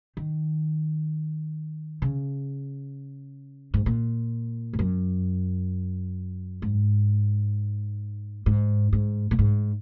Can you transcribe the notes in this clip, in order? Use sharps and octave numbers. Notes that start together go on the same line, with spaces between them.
D#3
C#3
G#2
A#2
G#2
F#2
G#2
G#2
G#2
A#2
G#2